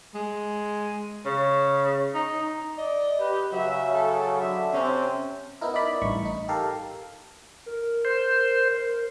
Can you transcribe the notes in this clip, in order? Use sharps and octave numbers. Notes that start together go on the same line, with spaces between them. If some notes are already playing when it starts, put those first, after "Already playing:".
G#3
C#3
D#4
D5 D#5
G4 B4
C#3 F#3 E5
A4
D3 E5
C3 C4 C#4
B3 D#4 E4 A#4
D#4 E4 A#4 D5 B5
A1 G2 B5 C#6
D#4
G4 A4 A#4 F5
A#4
C5